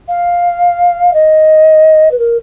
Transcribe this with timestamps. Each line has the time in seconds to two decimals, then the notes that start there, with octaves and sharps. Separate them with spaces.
0.08 F5
1.13 D#5
2.11 B4
2.18 A#4